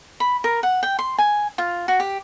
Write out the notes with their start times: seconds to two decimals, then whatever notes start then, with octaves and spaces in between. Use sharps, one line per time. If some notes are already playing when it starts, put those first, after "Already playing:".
0.20 B5
0.44 A#4
0.63 F#5
0.83 G5
0.99 C6
1.18 G#5
1.58 F4
1.88 F#4
2.00 G4